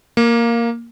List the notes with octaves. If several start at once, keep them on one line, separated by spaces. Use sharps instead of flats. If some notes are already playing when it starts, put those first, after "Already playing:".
A#3